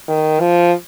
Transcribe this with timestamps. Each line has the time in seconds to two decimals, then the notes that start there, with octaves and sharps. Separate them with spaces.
0.08 D#3
0.40 F3